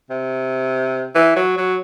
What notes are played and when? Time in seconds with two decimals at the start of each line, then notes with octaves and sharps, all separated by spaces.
0.10 C3
1.15 E3
1.36 F#3
1.57 F#3